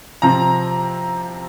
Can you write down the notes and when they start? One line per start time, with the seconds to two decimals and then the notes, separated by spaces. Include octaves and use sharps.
0.22 C3 F3 C4 A#5